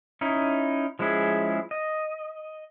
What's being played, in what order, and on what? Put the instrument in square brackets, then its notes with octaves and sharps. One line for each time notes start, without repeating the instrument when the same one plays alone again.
[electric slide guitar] C#4 D#4 E4
F3 G#3 C#4 E4 G#4
D#5